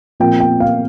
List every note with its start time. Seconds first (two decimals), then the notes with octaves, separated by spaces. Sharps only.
0.20 A#2 F3 C4 F4 G5
0.40 G5
0.60 F5